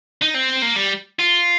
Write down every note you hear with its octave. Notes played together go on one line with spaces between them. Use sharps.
D#4
C4
A#3
G3
F4